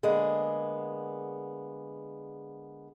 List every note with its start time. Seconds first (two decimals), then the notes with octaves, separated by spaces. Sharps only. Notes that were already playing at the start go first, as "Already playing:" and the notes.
0.03 D3 G#3 A#3 B3 G#4